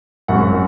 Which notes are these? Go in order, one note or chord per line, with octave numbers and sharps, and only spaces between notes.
G#1 F#2 C#3 F#3 F#5